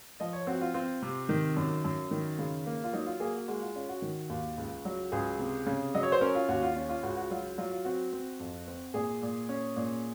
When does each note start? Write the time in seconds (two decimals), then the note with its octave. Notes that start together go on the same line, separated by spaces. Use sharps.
0.20 F3 D#5
0.33 C#5
0.47 C4 F#4
0.61 F4
0.74 C4 F4
1.02 C3
1.29 D#3
1.56 F#2
1.84 F#2
2.11 D#3
2.39 C#3
2.66 A#3
2.84 F4
2.93 F#3 D#4
3.06 F4
3.20 A#3 G#4
3.35 F#4
3.48 G#3 F#4
3.61 F4
3.75 C#4 F4
3.89 F#4
4.02 D#3
4.30 D#2
4.58 C#2
4.85 F#3
5.12 C#2 G#4
5.39 C3
5.66 C#3
5.94 F#3 D#5
6.03 C#5
6.12 C5
6.21 C#4 A#4
6.35 F4
6.48 D#2 F#4
6.62 F4
6.76 C#4
6.89 F4
7.03 C#2 F#4
7.17 F#4
7.30 F#3 F4
7.58 F#3 F4
7.72 F4
7.85 C4 F#4
8.13 C4
8.40 F2
8.67 C4
8.94 A#2 G#4
9.22 A#2
9.49 C#4
9.76 A#2